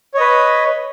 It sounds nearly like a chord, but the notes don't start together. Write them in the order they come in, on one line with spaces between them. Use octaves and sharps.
C#5 D#5 B4